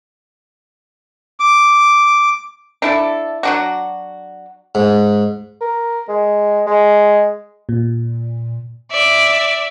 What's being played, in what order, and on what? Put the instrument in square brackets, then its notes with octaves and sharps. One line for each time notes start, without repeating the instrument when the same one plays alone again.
[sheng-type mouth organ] D6
[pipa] D4 E4 A4
F#3 D4 F#4
[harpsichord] G#2
[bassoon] A#4
G#3
G#3
[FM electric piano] A#2
[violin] D5 E5